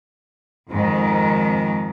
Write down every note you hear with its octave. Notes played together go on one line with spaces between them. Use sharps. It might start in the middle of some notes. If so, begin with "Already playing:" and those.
F2 G#2 D#3